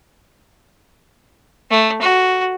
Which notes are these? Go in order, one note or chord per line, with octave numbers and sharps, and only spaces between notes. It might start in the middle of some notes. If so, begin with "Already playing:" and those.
A3
F#4